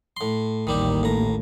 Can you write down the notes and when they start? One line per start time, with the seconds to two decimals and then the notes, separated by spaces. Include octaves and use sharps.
0.17 A2 C6
0.67 A1 D#2 D#3 G3 A#3 G4
1.03 A2 A#5